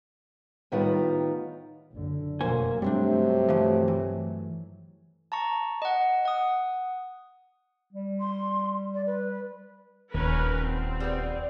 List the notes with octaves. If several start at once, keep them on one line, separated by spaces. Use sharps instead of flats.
A2 D#3 G3 B3 F4 A#4
F#1 D3
F1 B2 F#3 A#3 C5 G#5
G2 C3 F#3 G3 A3 C4 D4
E3 F3
E3
A5 A#5 C#6
D#5 F#5
F#5 D#6
G3
C6
D5
B4
D#1 D#2 C#4 A#4 B4
C4
G3 B3